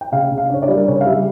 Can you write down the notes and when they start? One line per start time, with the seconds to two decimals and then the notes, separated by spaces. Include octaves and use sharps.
0.01 G5
0.12 C#3 F5
0.31 C#3
0.38 F5
0.50 D4 C#5
0.62 D5
0.68 G3
0.76 A#4
0.88 C#3 C#5
1.01 F5
1.07 G3 E5